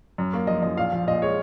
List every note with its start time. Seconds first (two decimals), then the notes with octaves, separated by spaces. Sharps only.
0.18 F#2
0.33 A#3
0.47 F3 D#5
0.62 F#2 D#5
0.77 A#1 F5
0.92 F3
1.07 A#2 D#5
1.22 G#3 C#5